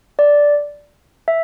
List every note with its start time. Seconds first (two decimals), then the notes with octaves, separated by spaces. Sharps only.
0.19 D5
1.28 E5